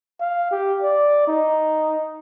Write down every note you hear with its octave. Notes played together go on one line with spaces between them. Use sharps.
F5
G4
D5
D#4